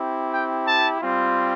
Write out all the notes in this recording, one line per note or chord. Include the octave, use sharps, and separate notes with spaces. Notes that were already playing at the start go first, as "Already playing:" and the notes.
Already playing: C4 E4 G4
G5
A5
G3 C4 F4